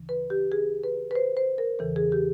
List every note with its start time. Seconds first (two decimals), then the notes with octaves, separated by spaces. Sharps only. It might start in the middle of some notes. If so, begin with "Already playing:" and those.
Already playing: D2 C#3 E3
0.09 B4
0.30 G4
0.52 G#4
0.84 B4
1.11 B4
1.15 C5
1.37 C5
1.58 A#4
1.79 E2 C#3 E3 A4
1.96 G#4
2.12 G4